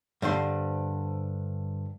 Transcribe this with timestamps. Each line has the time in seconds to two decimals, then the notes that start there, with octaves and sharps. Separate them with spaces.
0.22 G2 D3 C5 C6